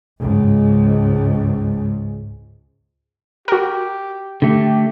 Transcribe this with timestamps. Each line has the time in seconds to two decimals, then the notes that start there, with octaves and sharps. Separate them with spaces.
0.19 C#2 G#2
3.48 F#4 G4 A#4
4.42 D3 A3 G4